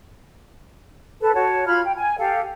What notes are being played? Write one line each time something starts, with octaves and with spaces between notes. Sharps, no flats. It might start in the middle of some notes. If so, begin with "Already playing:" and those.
A4 B4 A5
F#4 C#5 A5
F4 B5 F6 G#6
G5
G#5
G4 A4 F5